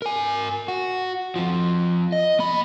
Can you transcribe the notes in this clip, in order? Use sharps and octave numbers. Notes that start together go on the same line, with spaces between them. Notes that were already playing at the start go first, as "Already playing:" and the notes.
A#4 G#5
F#4
F2 F3
D#5
A#3 B5